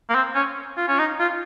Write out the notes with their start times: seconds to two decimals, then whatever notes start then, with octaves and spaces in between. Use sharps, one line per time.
0.10 A#3
0.15 C4
0.35 C#4
0.77 F4
0.88 C#4
0.99 D#4
1.20 F4